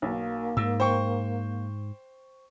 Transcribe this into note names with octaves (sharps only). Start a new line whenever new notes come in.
B1 A#3
G#2 E6
C5 G5 C#6